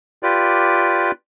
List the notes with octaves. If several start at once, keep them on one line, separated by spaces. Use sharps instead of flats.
F4 G4 B4 D5